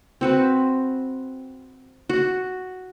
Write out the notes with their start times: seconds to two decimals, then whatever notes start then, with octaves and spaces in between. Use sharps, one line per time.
0.21 C4 F#4 B4
2.09 F#4